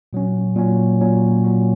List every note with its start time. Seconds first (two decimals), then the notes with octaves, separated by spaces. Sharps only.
0.13 A#2 F#3 C#4
0.56 A#2 F#3 C#4
1.00 A#2 F#3 C#4
1.44 A#2 F#3 C#4